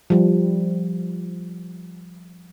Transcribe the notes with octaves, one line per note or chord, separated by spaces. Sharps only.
F3 G3